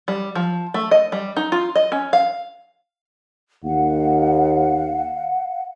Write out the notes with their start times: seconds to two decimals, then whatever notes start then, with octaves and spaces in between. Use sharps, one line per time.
0.08 G3
0.35 F3
0.74 A3
0.91 D#5
1.12 G3
1.37 D#4
1.52 F4
1.75 D#5
1.92 C#4
2.13 F5
3.64 D#2 F5 F#5